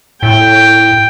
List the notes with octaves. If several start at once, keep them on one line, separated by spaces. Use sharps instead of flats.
A2 G5